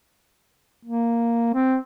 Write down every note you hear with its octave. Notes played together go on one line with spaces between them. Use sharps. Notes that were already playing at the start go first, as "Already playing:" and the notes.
A#3
C4